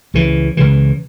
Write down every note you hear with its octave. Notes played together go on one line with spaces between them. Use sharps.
C#2 C#3 E3
C#2 C#3 E3